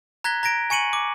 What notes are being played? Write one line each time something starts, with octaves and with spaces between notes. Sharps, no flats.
A#5 F#6 G#6 A#6 B6 G7
A#5 G#6 A#6 D7
G#5 C#6 C#7 D#7 F#7
D6